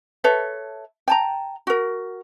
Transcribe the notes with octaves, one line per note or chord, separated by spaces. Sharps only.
A4 B4 C#5 E5
G5 A5 A#5
F#4 A#4